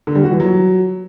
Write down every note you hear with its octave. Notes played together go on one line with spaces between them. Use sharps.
D3
G3
F#4
E3
F#3